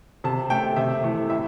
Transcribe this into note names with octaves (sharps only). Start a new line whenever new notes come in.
C3 A5
A3 G5
C3 E5
E3 A3
A2 E5